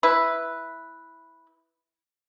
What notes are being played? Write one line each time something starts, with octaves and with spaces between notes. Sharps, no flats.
E4 B4